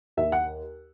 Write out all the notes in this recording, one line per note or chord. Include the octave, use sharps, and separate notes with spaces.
D#2 E5
F#5